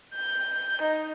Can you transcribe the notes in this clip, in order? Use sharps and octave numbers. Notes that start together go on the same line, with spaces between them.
G6
D#4